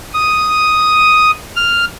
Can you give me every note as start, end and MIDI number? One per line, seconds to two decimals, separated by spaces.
0.14 1.31 87
1.56 1.85 89